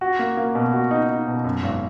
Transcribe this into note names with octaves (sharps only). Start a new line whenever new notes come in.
F#4
A#3
A#3
B2
F#4
D#4
D#4
B2
F#2
G#1